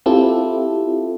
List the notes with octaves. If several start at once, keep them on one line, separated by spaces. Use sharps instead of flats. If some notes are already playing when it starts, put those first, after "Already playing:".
C4 E4 F4 G4 A4